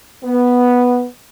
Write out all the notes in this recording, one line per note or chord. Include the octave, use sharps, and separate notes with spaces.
B3